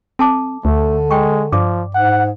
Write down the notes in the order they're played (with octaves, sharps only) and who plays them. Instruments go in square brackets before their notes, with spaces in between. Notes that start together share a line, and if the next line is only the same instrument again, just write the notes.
[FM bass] C4 [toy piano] A4 A5 D6
[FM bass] D2 [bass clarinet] D3 [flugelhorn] A3
[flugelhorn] G#3 [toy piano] G5 C#6
[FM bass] G2 [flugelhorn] F3 [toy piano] D5 D6
[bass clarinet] G#2 [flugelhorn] F#5